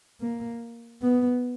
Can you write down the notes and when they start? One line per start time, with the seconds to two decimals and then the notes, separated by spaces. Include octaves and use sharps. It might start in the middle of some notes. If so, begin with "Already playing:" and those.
0.21 A#3
1.02 B3